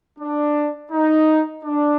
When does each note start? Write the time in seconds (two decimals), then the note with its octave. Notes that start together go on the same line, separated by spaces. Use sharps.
0.19 D4
0.92 D#4
1.65 D4